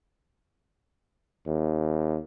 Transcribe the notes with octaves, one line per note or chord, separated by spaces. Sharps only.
D#2